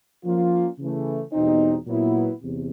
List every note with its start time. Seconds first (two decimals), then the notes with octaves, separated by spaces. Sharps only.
0.24 F3 A#3 C#4 F4
0.79 C#3 E3 A3
1.33 E2 B2 G3 C4 D#4
1.87 A#2 F#3 B3 E4
2.42 E2 C3